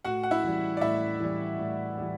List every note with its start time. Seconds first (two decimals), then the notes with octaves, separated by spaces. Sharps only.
0.05 A2 F#4 F#5
0.23 F#5
0.31 E4 E5
0.43 E3 G3
0.77 D5
0.81 A2 E4 E5
1.20 E3 G3
1.59 A2
1.98 E3 G3